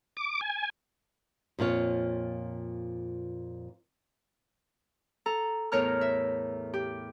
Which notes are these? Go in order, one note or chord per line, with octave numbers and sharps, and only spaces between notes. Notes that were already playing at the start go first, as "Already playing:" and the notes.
D6
G#5
F2 A#2 F4 C#5
A4 A#5
E2 A2 A#4 C#5 A#5 F6
E5
G4